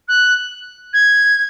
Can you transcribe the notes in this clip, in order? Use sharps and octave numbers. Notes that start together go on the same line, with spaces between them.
F#6
G#6